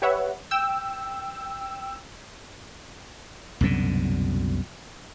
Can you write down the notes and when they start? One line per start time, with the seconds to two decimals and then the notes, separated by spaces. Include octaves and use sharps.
0.02 G4 B4 C#5 E5 F#5
0.51 G5 E6
3.61 C2 F#2 B2 D3